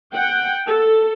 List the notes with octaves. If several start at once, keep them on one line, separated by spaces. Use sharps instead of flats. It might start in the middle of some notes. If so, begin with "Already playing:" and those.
F#5 G5
A4